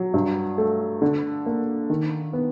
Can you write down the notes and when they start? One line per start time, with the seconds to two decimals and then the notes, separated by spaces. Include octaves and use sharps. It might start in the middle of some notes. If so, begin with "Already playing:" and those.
Already playing: F#3
0.14 G2
0.58 A3
1.02 D3
1.46 A#3
1.90 D#3
2.33 B3